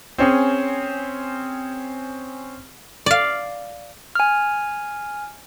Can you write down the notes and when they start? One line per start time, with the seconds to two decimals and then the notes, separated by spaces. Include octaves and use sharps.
0.18 C4 C#4 G#4
3.06 D5 F5
4.15 G#5 F6